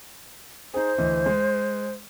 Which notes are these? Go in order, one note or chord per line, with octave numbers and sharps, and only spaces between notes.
D#4 G#4 C5
D2 E3 D#5
G#3